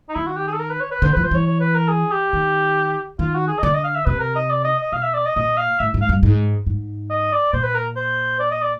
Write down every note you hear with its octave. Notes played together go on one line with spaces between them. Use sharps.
D#4
D#3 E4
F#4
G4
G#4
A4
A#4
B4
C#5
B4
D3 C5
F3 B4
C5
E3 C#5
C#5
B4
A#4
G#4
G4
D#3
D#3 F4
F#4
G#4
D#5
D3 D5
D#5
F5
E5
C3 B4
A#4
D#5
D5
D#5
D#5
B2 F5
E5
D5
D#5
A#2 D#5
F5
A2 E5
G#2
F5
G2
G#2
G#2
D#5
D5
A#2 C5
B4
A#4
C5
D5
D#5
D5